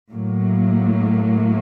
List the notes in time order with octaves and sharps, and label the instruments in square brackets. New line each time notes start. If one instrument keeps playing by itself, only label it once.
[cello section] A2 F#3 A#3